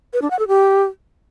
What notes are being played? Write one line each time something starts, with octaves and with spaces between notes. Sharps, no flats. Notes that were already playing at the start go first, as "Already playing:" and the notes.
B4
D4
F#5
A4
G4